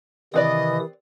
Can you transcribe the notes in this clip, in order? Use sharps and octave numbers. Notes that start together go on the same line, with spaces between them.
C3 D#3 E3 C4 B4 D5 D#5 D#6